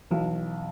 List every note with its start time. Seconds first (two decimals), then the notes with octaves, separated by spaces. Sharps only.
0.11 B1 B2 E3